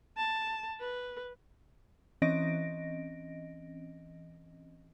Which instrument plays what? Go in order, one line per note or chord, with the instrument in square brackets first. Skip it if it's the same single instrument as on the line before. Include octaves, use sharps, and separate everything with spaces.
[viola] A5
B4
[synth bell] E3 C4 C#4 D#5 A#6 D7